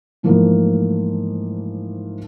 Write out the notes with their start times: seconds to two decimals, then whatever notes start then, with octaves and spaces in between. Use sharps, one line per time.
0.23 G#2 E3 F3 A3 A#3